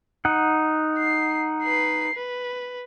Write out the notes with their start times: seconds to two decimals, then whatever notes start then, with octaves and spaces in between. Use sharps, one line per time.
0.25 D#4 F#5
0.98 C7
1.63 B4 C7
2.15 B4